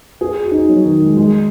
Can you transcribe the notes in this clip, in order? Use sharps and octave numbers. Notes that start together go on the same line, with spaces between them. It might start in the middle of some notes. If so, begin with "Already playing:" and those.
G#4
F#4
D#4
F#4
F#3
D#3
G#3
G#3